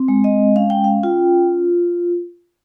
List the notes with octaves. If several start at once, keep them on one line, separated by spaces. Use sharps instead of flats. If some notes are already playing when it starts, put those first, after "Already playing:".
Already playing: C4
G#3
D#5
C#4 F5
G5
F5
F4 G5